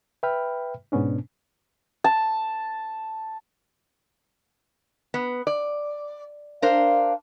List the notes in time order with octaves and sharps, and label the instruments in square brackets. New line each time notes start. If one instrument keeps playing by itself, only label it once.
[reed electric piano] B4 E5 G5 B5 F6
G#2 B2 B3 C#4 D4
[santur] A5
[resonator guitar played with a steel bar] B3
D5
[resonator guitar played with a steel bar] D4 A#4 C5 [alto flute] F5